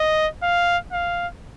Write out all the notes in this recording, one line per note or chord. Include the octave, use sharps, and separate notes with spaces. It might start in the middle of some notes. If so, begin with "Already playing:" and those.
Already playing: D#5
F5
F5